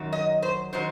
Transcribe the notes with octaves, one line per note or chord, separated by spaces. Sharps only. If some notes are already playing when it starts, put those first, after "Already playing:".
Already playing: F#2 D#3 F#3
D#5
C5
D#3 F#3 C5